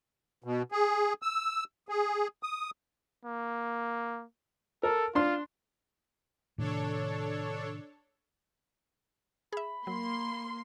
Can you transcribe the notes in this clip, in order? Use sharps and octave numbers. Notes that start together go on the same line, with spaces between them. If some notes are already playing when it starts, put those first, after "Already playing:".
B2
G#4
E6
G#4
D#6
A#3
A4 A#4
D4 F4 C6
A2 C3 D#3 D4 A4 C#5
G#4 E5 B5
F#3 A#3 C6